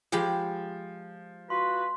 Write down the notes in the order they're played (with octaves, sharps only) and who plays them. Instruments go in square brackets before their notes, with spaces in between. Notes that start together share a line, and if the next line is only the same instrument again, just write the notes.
[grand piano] F3 [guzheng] G#3 G4 B5
[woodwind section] F4 F#4 B4 [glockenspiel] C6